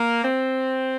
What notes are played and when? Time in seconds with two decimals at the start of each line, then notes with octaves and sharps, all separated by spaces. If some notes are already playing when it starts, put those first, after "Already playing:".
Already playing: A#3
0.24 C4